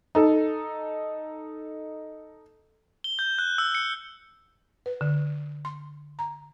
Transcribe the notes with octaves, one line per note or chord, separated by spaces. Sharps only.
D#4 A4
G7
G6
F#6
E6
C#7
B4
D3
C6
A#5